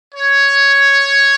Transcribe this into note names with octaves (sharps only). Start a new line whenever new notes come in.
C#5